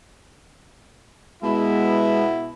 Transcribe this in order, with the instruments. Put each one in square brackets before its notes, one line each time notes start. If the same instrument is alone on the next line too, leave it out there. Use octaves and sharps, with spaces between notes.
[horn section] B2 B3 E4 [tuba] G#3